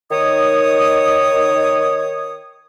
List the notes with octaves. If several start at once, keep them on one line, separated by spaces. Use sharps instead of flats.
D#3 C#5 D#6